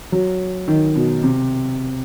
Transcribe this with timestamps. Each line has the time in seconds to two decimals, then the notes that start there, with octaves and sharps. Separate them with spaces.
0.12 F#3
0.68 D#3
0.96 B2
1.23 C3